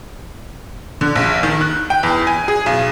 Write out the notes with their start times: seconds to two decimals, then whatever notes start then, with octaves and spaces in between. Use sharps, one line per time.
1.01 D3
1.15 A#1
1.43 D#3
1.61 F#6
1.90 G5
2.03 E2
2.27 G#5
2.48 G#4
2.66 B1